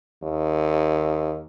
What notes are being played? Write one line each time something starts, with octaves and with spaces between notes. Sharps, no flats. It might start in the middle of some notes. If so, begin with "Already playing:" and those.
D#2